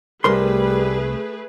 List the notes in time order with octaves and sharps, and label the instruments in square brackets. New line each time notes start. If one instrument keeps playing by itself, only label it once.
[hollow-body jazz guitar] C2 A#4 C6 [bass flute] G3 [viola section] A3 G#4 B4